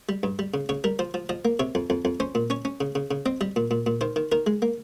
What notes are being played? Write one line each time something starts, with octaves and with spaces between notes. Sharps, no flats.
G3
G2
G3
C#3
C#3 C#5
G3 A#4
F3 C5
F3
F3 D#5
A#3
C3 C#5
F2
F2
F2
C#4 C5
A#2
C#4 C#5
C#4
C#3
C#3
C#3
C4 D#5
G3 D#5
A#2
A#2
A#2
D#3 C5
D#3
D#3 A#4
G#3
A#3